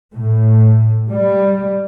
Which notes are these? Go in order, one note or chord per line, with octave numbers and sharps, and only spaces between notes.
A2
G3